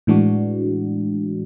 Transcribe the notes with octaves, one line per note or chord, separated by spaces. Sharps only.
A2 E3 G#3 D4 F#4